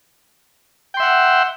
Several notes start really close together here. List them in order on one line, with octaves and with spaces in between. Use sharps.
G5 C6 E5 F#5